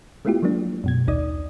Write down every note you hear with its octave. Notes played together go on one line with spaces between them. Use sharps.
G#3 A3 B3 E4 F4 G4
F3 F#3 G#3 A#3 D4
F#2 B2 G#6
A#1 D#2 D#4 D5 D#6